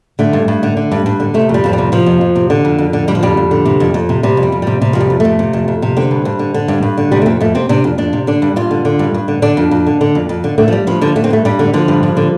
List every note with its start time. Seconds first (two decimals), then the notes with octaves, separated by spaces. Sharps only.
0.19 D3 A3
0.33 G2
0.48 G2
0.63 D3
0.77 D3
0.92 G2
1.06 G2
1.20 D3
1.34 C3 A3
1.49 F2
1.54 G3
1.64 F2 F3
1.73 G3
1.78 C3
1.92 C3 F3
2.06 F2
2.21 F2
2.36 C3
2.50 D3
2.65 F2
2.78 F2
2.93 D3
3.08 D3 G3
3.15 F3
3.23 F2 G3
3.37 F2
3.51 D3
3.66 C3
3.80 F2
3.94 F2
4.09 C3
4.23 C3 G3
4.37 F2
4.43 G3
4.52 F2
4.62 C3 G3
4.81 C3 G3
4.93 F2 F3
5.01 G3
5.10 F2
5.20 C3 A3
5.39 C3
5.53 F2
5.68 F2
5.82 C3
5.97 D3 C4
6.11 G2
6.25 G2
6.39 D3
6.54 D3
6.68 G2
6.83 G2
6.98 D3
7.11 C3 G3
7.22 A3
7.26 F2 C4
7.41 F2 A3
7.55 C3 C4
7.69 C3 D4
7.84 F2
7.98 F2 D4
8.13 C3
8.27 D3 D4
8.42 G2
8.56 G2 F4
8.71 D3
8.85 D3
8.99 G2
9.14 G2
9.28 D3
9.42 D3 D4
9.57 F2
9.71 F2
9.87 D3
10.01 D3
10.15 F2
10.29 F2
10.44 D3
10.58 D3 A3
10.68 F3
10.72 G2 G3
10.87 G2 F3
11.01 D3 F3
11.16 D3 A3
11.24 C4
11.30 G2 A3
11.45 G2 G3
11.59 D3
11.73 D3 F3
11.88 G2
12.03 G2
12.17 D3